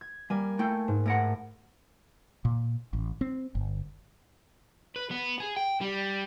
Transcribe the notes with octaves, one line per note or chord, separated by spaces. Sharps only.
G#6
G3 A#3 G#5
A3 E4 G5
G#2
A2 A#4 F#5
A#2
A1
C4
G1
B4
B3
G#4
G5
G3